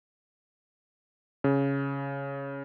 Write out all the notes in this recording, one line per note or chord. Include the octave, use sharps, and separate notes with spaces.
C#3